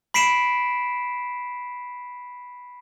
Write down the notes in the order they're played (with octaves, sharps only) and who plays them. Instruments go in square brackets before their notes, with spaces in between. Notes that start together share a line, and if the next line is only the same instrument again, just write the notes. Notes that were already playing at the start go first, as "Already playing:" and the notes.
[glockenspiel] B5 B6 C7 D7 E7